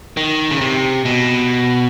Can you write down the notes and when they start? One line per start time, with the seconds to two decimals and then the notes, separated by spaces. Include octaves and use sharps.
0.17 D#3
0.51 C#3
0.61 C3
1.05 B2